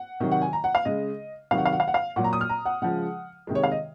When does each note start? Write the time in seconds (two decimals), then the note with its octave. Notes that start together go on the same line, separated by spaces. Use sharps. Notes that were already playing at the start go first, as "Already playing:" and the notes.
Already playing: F#5
0.20 C3 D#3 F#3
0.32 F#5
0.42 G#5
0.53 A#5
0.64 F#5
0.75 F5
0.85 C#3 G#3 D#5
1.51 C3 D#3 F#3 F5
1.58 F#5
1.66 F5
1.73 F#5
1.80 F5
1.88 F#5
1.94 F5
2.16 A#2 F#3 F#5
2.24 A#5
2.33 D#6
2.41 F6
2.49 A#5
2.65 F#5
2.82 C#3 F3 G#3 F#5
3.47 C3 D#3 G#3
3.55 C#5
3.64 F5
3.72 D#5